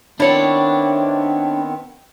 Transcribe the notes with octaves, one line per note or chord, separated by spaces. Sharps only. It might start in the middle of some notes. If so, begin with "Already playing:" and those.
D#3 B3 C4 D4 E4 C#5